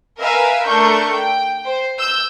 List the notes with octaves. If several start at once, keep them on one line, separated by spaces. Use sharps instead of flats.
A#4 B4 E5 F5 G#5
A3 D4 A#4 C#6 G6
G5
C5
E6 G6